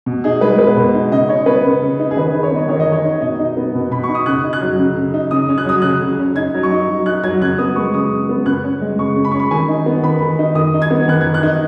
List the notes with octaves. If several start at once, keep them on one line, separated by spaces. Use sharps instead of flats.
B2
D#4 G#4
G#3 B4
B2 B4
B2
D#4
C#3 D#5
D#4 C#5
B3 B4
C#3
C#3
D#4
G#4
D#3 B4
D#4
C#5
B3 D#5
D#3 C#5
D#5
D#3
C#5
D#4
B2 D#5
D#4
B3
B2
B2 B5
C#6
D#4
D#6
C#3 F#6
D#4
F#6
F#3
C#3
C#3
D#4
C#3 D#6
C#4
F#6
F#3 D#6
C#3 F#6
C#3
C#4
D#4 G#6
F#3
C#6
D#4
F#3
D#4 F#6
F#3 G#6
C#3 F#6
B3 D#6
G#3 C#6
C#3 D#6
C#3
B3
C#3 F#6
C#4
G#3
C#3 C#6
C#3
B5
C#6
C#4
B5
D#3 G#5
D#4
B3
D#3 B5
D#3
D#4
D#3 D#6
D#4
G#6
B3
D#3 F#6
G#6
D#3
F#6
D#4